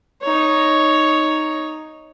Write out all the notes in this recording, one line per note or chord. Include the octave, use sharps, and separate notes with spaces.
D#4 C#5